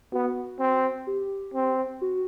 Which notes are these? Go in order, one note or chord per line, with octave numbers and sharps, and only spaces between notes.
B3 F#4
C4
G4
C4
F#4